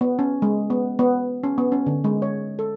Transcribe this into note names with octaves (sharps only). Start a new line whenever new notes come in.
B3
C#4
G#3
B3
B3
C#4
B3
C#4
D3
G#3
C#5
A4